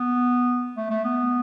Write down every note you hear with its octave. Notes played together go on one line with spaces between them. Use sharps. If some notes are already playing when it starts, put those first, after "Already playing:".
Already playing: B3
A3
A3
B3